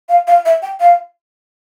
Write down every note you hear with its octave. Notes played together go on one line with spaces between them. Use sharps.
F5
F5
E5
G5
F5